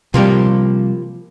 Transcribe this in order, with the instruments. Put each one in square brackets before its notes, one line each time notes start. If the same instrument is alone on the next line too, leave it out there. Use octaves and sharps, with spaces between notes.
[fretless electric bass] C3 G3 [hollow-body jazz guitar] F3 A#3 G4